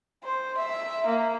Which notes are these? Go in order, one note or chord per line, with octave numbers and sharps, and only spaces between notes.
C5
E5
A#3